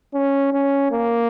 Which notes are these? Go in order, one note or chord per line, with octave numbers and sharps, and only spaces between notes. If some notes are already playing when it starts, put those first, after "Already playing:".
C#4
C#4
A#3